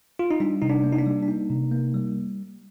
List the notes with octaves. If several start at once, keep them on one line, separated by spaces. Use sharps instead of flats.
F4
D#4
G3 D4
C3 D#4
D4
A#3
D#4
D4
G3
D4
A#3 D#4
C3
A#3
G3